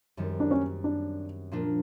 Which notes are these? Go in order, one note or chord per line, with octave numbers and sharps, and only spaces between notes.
F#2 D#3 G3 C4
D4
C#4
D4
A#2 F3 A#3 D4 F4